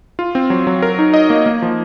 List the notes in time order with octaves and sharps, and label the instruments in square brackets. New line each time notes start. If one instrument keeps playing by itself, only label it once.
[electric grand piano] F4
C4
F#3
F#3
A#4
D#4
D#5
A#3
A#3
F3